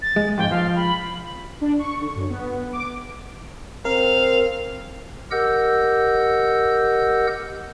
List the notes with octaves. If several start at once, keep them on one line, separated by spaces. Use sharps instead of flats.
A6
G#3
F2 G#2 G5
F3 F5
B5
D4
C#6
D3
F#2
B3
D6
C4 A#4 F5
G4 A#4 D#5 F#5 E6 G6